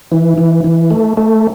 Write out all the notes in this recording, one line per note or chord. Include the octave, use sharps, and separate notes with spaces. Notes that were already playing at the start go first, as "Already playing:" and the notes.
E3
E3
E3
A3
A3